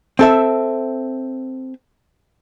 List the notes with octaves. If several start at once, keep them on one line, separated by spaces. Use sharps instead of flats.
C4 A4 E5